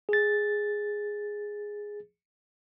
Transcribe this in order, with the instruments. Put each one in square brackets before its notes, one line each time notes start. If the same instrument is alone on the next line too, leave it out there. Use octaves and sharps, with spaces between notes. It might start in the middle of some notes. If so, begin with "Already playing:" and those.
[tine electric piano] G#4 A6